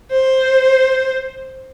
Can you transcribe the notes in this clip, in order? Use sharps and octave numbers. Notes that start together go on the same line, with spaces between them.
C5